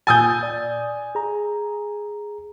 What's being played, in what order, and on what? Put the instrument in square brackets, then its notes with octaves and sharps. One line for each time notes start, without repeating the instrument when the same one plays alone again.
[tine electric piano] A#2 E6 A6 [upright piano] G#5 D#6 G6
[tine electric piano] D5
G#4 A#5